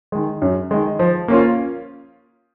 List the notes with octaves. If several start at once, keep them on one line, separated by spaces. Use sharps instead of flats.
D#3 G#3
F#2
D#3 G#3
F3
A#3 C#4 F4